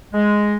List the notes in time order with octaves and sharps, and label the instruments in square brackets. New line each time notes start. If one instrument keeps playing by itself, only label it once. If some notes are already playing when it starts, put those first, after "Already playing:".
[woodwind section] G#3